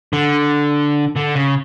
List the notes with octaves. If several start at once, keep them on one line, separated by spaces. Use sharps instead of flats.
D3
D3
C#3